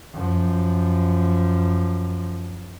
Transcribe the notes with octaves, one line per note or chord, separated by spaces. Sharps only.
F#2 F3